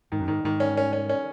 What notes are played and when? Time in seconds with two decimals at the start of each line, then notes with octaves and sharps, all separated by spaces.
0.12 G#2 D#3
0.20 F#2
0.28 G#2 D#3
0.44 G#2 D#3
0.60 C#4
0.77 C#4
0.93 C#4
1.09 C#4